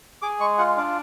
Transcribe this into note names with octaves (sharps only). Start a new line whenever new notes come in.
G#4 D6
G#3 C#6
F4 F#5
D4 F5